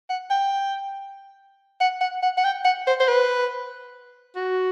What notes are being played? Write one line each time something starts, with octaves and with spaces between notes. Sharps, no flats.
F#5
G5
F#5
F#5
F#5
F#5
G5
F#5
C5
C5
B4
F#4